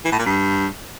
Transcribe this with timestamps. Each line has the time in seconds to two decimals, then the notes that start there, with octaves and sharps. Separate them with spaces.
0.05 E3
0.12 A2
0.19 A#2
0.26 G2